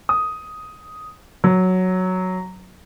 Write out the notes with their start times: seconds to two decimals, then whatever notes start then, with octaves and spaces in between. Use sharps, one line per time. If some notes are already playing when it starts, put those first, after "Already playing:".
0.09 D#6
1.44 F#3